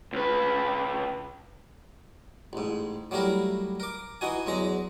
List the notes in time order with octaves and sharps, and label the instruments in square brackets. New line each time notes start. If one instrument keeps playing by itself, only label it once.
[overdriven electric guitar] C#2 B4
[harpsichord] A1 G#2
F#3 G3 A3 E4 A#4
A#4 D6
E3 D#4 F#4 G#5
E2 F#3 G#3 A#5